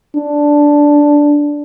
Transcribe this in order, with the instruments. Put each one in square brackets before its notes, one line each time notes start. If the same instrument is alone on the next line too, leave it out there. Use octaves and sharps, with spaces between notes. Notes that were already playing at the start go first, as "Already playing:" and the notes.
[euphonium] D4